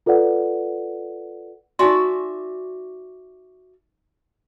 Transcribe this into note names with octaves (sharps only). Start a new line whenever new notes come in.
F4 A4 B4 D5 F#5
D#4 F#4 D5 E5 G#5 C6